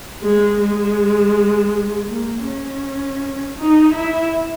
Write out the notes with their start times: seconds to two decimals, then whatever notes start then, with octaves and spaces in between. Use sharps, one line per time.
0.23 G#3
0.61 G#3
2.09 A#3
2.46 C#4
3.58 D#4
3.94 E4